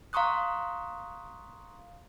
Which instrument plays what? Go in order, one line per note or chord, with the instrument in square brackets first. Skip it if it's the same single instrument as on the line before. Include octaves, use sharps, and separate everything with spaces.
[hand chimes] F5 A#5 C6 C#6 D#6 F#6